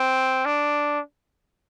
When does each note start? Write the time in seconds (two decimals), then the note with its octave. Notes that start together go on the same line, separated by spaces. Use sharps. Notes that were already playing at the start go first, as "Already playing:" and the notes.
Already playing: C4
0.46 D4